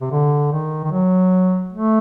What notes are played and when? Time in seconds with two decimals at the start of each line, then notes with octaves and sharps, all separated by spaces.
0.01 C3
0.12 D3
0.52 D#3
0.84 D#3
0.92 F#3
1.73 A3